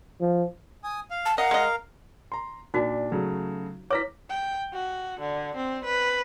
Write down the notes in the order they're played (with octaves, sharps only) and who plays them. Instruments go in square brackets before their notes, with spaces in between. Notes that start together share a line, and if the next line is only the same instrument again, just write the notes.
[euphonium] F3
[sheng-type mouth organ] G#5 D#6
F5
[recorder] A5
[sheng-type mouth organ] A#4 F5 [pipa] D#5 [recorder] F#5
[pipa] G#3 D#5
[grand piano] A#5 C6
[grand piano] A#2 D4 [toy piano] D#4 F#4
[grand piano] C#3 F#3 A3
[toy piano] E4 B4 C#5 [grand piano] D6 A#6 B6
[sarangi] G5
F#4
D3
C4
B4